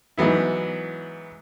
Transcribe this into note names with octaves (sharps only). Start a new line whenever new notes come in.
G#2 E3 F#3 B3 E4